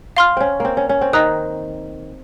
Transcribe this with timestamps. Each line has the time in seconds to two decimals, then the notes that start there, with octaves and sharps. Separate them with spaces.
0.17 F5 C6 F6
0.37 C4 C#4
0.60 A#3 C4
0.77 C#4
0.89 C#4
1.01 C4
1.13 D#3 D#5 A#5 D#6 F#6